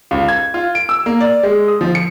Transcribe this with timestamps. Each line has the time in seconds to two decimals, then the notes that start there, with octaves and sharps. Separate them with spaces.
0.11 C#2
0.28 G#6
0.54 F4
0.75 D7
0.89 E6
1.06 A#3
1.21 D5
1.43 G#3
1.68 D#6
1.81 F3
1.95 C#7